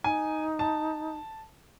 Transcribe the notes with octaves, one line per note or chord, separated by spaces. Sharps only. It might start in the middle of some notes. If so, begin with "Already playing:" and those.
D#4 G#5
A5